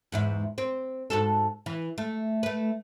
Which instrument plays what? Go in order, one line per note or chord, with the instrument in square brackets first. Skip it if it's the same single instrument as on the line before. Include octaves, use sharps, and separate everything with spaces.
[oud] E2 G#2 E4
C4
G#2 F#4 A4
E3
A3
A3 B4